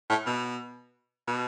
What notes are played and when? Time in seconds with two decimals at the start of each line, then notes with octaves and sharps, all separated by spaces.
0.10 A2
0.26 B2
1.27 B2